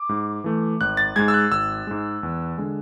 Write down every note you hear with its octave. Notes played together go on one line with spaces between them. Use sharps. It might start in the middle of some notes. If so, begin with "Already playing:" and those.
Already playing: D6
G#2
E3 A3
G#1 F#6
A6
G#2 G#3 G#6
E6
F#6
G#1 E6
G#2 G#3
E2
D3 G#3